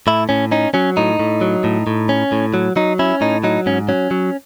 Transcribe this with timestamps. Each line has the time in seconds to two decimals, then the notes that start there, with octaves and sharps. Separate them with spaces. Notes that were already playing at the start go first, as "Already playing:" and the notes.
0.07 A2 E4
0.29 A2 C#4
0.51 C#4 D#4
0.74 F#3 C#4
0.97 A2 D#4
1.19 A2
1.41 F#3
1.64 A2
1.87 A2
2.09 C#4
2.32 A2
2.54 F#3
2.76 F#3 D#4
2.99 C#4 E4
3.21 A2 D#4
3.44 F#3 D#4
3.66 G#2 C#4
3.89 F#3 C#4
4.11 F#3